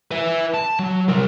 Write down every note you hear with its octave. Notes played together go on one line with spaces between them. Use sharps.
B4 E5
A5
F#3
C2 A#4